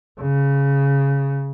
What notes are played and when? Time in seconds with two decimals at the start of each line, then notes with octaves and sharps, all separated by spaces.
0.21 C#3